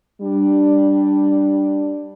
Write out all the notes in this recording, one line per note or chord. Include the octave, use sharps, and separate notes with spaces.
G3 D4